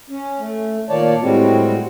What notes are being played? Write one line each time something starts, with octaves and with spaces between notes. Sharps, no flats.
C#4
A3
A#2 D#3 A#3 C#5 D5 A5
A2 G3 G#3 C4 F#4